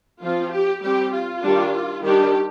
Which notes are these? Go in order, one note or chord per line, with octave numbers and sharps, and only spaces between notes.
F3 C4 F4
G4
G3 C4 G4
F4
D#3 G3 D4
D#3 G3 D4 G4